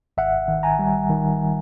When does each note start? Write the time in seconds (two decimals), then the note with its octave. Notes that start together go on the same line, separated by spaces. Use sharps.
0.17 G#1 E5 F#5
0.48 D#3
0.63 G#5 A#5
0.79 G3
1.09 D#3